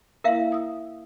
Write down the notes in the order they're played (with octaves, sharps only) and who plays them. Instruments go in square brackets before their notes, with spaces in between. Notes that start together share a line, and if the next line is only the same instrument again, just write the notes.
[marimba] A#3 E4 [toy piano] A#4 E5 F5
[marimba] D#6 E6